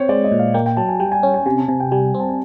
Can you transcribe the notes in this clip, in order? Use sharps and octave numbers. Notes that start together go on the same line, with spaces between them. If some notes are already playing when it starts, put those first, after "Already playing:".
Already playing: C4 C5 C#5
G#3 D5
D#5
A#2
F5
A#3 G5
G5
F#3 A5
G#5
G3 G5
G#5
C#4 G5
G#5
C3 G#5
A5
C3 G#5
G5
G3 G#5
C4
A5
G#5